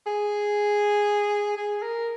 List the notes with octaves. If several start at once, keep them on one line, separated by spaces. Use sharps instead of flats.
G#4
G#4
A#4